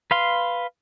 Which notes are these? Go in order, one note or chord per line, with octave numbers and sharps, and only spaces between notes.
B4 F5 C6